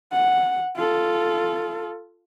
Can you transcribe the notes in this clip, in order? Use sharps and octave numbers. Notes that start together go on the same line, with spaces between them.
F#5
F4 A4